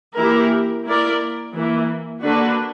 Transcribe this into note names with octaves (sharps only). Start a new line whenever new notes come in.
E3 A#3 E4 G4 A#4
A#3 E4 A#4 D5
E3 A#3 E4
D3 A#3 D4 F#4 B4